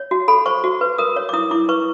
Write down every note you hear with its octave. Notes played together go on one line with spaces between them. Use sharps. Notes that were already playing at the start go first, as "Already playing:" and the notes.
Already playing: C#5
F#4
A4 B5
C5 C#6
F#4
B4
A#4 D#6
C#5
D6
E4 D#6
E4 D6
B4 C#6